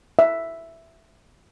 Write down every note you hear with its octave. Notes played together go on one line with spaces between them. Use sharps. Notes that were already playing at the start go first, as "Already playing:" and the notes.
E5